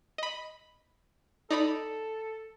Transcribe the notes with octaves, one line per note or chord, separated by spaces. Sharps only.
D#5 B5
D#4 A4 D5 B5